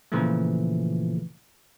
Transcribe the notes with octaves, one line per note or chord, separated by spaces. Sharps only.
A#2 C#3 E3 F3 A3